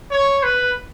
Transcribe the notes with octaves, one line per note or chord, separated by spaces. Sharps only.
C#5
B4